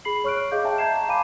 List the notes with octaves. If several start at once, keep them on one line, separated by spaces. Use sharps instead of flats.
G#4 B5 C7 F#7
C#5 C#6 F6 F#6 D7
G#4 D#5 F5 D6 G6
D#5 E5 G5 A5 A#5
A5 A#5 G6 G#6 C7 E7
F5 G#5 A5 B5 D6 D#7